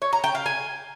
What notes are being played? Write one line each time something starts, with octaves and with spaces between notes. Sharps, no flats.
C#5
A#5
G5
F5
G#5